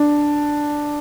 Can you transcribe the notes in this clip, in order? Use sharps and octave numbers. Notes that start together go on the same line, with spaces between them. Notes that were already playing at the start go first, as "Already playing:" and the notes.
Already playing: D4